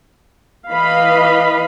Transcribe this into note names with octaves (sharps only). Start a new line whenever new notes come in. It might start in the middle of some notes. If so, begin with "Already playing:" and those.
E3 B4 D#5 F5 B5